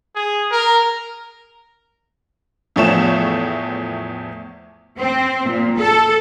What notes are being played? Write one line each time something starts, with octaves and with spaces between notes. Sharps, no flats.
G#4
A#4
E2 A2 F3 A3 C#5 E7
C4
A#2
A4